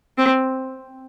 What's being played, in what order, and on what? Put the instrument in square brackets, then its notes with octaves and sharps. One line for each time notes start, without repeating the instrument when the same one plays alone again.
[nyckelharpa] C4